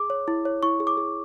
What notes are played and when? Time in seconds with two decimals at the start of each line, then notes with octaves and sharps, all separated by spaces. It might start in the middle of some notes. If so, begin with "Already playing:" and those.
Already playing: G#4 D6
0.10 C#5
0.28 E4
0.45 C#5
0.63 E4 C#6
0.80 G#4
0.87 D6
0.97 G#4